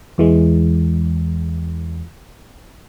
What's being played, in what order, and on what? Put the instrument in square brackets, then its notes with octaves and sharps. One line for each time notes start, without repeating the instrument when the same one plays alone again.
[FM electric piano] E2 E3 G#3